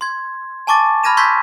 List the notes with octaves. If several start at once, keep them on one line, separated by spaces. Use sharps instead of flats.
C6 G#6
G#5 A5 C#6 D6 A6
B5 F6 G#6 A#6 D#7 E7
C6 C#6 E6 G6 G#6 B6